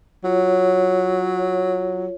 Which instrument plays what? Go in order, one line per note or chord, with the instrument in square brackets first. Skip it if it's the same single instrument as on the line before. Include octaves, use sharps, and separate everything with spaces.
[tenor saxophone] F#3 [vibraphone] F4 C#5